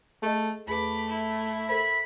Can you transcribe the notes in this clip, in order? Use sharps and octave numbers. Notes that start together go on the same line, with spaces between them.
A3 G#4 A4 D#5
E2 A3 G#4 B4 B5 D6
E4
A4 A#4 C5 B5